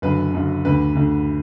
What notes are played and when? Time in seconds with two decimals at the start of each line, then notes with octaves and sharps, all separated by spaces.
0.02 F#1 F#2 D3 B4
0.34 F#1 F#2 D3
0.65 D2 D3 B4
0.95 D2 D3